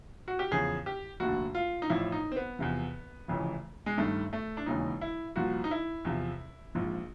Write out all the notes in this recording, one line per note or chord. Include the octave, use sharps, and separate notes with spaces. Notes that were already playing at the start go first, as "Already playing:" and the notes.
F#4
G4
E2 C#3 F3 G#4
G4
F1 D#2 D3 F#4
F4
D#4
A1 A2 F3 E4
D#4
C4
B3
E2 C3 F3
F1 F2 C#3 E3
G#3
G1 G2 D#3 A3
A3
D4
E1 D#2 C#3 E3 D#4
E4
C2 A#2 F3 F#4
D#4
E4
E2 C3 F3
A#1 G#2 F3